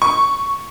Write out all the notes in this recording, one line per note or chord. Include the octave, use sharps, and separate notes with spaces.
C#6